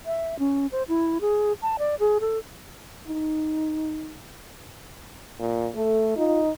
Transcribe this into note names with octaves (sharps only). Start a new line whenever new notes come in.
E5
C#4
C5
E4
G#4
A5
D5
G#4
A4
D#4
A#2
A3 A4
D#4 F4